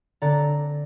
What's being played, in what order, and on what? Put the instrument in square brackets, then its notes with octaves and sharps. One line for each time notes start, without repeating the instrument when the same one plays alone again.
[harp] D3 C4 D5 A#5 A6